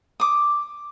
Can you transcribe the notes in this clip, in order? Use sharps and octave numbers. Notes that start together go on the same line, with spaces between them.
D6 D#6